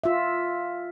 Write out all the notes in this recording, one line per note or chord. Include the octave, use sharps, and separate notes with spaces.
F4 E5